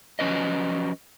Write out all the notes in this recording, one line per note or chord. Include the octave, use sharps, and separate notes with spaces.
F3 F#3 C#4 B4 D#5